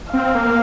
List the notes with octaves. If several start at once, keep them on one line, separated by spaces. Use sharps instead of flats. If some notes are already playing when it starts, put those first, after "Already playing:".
C4 F5
A#3